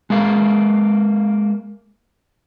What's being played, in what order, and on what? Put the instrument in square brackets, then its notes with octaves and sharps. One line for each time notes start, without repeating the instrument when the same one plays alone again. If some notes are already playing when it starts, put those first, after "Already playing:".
[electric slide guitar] G#3 A#3 F5